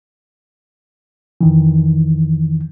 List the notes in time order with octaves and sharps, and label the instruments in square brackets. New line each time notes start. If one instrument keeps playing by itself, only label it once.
[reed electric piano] F2 D#3 E3